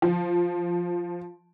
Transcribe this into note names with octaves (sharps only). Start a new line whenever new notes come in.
F3